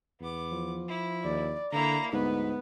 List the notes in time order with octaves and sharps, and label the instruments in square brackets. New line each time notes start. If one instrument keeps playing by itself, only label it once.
[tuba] E2 [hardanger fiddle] B3 D6
[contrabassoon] F3
[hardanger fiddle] E4
[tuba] D#2 [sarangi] D5
[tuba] D3 [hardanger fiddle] A#3 E4 [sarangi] A#5
[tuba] D2 [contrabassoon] G#2 [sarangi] B3 [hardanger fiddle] B4